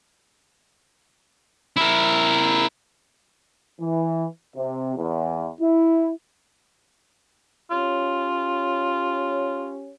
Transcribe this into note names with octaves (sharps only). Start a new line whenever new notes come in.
E4 A#4
E3
C3
E2
E4
C#4 F4 G4 C#5